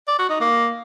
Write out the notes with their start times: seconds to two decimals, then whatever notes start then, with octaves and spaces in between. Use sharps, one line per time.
0.08 D5
0.19 F#4
0.30 D#4
0.40 A#3